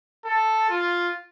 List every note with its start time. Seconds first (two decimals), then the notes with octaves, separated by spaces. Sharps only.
0.25 A4
0.70 F4